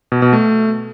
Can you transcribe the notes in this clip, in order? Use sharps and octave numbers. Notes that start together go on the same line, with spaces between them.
B2
B2
A3